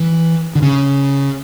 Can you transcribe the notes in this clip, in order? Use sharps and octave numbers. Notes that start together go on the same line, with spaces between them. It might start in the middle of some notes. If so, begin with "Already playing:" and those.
Already playing: E3
D3
C#3